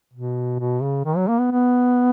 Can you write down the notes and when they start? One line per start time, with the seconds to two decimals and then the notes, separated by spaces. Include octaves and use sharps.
0.13 B2
0.59 B2
0.82 C#3
1.05 D#3
1.17 F#3
1.28 A#3
1.39 B3
1.51 B3